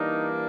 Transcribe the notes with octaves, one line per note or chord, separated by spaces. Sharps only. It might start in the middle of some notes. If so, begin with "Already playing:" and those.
Already playing: E3 G3 A#3 D4 D#4